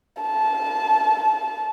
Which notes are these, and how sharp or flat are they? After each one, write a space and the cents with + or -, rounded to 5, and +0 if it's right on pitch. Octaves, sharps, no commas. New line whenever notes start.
A5 -20